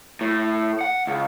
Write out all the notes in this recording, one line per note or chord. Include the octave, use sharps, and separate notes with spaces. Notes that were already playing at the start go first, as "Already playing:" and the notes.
A2
F#5
C#2